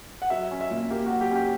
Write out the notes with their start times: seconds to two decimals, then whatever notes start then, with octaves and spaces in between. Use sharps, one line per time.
0.22 F#5
0.30 F#3 E5
0.51 C#4
0.61 E5
0.71 A#2
0.90 A#3 G4
1.06 F#3 F#4
1.21 G4
1.31 C#4 G4